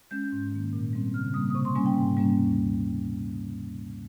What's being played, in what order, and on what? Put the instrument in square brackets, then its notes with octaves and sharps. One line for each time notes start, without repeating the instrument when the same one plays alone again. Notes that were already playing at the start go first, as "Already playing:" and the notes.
[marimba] G#3 C#4 G6
G#2
D#3 A#3
A#2
G3 C4
C#3 F6
G3 A#3 D#6
D#6
C3 C#6
C6
G3 A#3 C#4 G#5
G5
G#2
G3 A#3 C#4
D#2